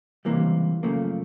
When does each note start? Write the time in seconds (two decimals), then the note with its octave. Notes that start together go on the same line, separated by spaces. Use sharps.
0.25 C#2 C3 E3 G3 A#3
0.83 F#2 C#3 F3 A3 A#3